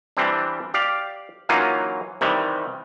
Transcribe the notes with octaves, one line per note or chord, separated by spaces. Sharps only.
E3 G3 C4 D4
G4 D5 F5
E3 F#3 A#3 C#4 D#4 F4
C3 D#3 E3 G3